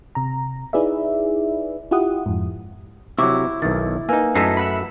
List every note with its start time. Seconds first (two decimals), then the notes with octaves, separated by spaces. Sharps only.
0.15 C3 A#5
0.73 D#4 E4 G#4 B4 D5 E5
1.91 E4 F4 G4 F#5 D#6
2.26 F2 G#2
3.19 C3 F#3 E4 C#6 D6
3.62 B1 D#3 A6
4.09 A#3 D#4 B4 G#5 E6
4.35 F#2 A3 D#4 E4 A4 E6 B6 C7
4.57 E5 F#5 B5